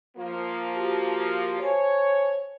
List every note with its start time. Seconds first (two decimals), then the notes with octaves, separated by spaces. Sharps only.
0.17 F3 A#3 F4
0.76 F#4 G4 A5
1.60 C5 C#5 G#5 A5